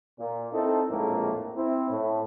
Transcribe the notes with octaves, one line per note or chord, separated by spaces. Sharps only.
A#2
C4 D#4 E4 A4
A#1 F2 A2 G#3 A#3
C4 E4
A2